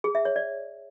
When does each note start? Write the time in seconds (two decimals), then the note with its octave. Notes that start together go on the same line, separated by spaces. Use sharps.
0.04 G#4
0.15 E5
0.25 C#5
0.36 D5